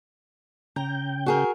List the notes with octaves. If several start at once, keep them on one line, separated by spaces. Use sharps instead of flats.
C#3 G5 A#5
F#4 G#4 A#4